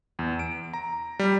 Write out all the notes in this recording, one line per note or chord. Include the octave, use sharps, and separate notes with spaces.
E2
D7
A#5
G3